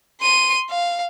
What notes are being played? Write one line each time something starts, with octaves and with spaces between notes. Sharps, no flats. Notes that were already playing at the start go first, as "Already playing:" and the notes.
C6 D#7
F5